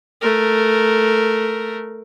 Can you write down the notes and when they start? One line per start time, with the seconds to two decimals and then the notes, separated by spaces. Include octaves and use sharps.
0.21 A3 A#4